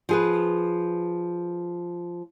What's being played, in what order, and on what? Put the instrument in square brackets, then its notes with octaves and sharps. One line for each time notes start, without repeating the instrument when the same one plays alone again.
[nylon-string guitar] F3 G#4 B4